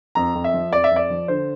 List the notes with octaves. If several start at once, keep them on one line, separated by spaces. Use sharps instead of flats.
F2 A#5
F2
E5
F3
F2 D5
E5
F2 D5
F3
D3 C5